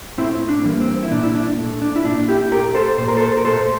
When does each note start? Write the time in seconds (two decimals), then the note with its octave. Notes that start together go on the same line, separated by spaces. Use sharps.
0.18 A2 C4 E4
0.49 D4
0.64 E3 G3 A#3
0.80 C4
1.03 E4
1.11 A#2 D4
1.23 E4
1.35 D4
1.58 A3
1.82 D4
1.96 E4
2.05 A#2 D4
2.28 E4 G4
2.51 A3 G4 A#4
2.75 A4 C5
2.98 A#2 C5
3.08 A#4
3.17 A4 C5
3.37 A#4
3.45 A3 A4 C5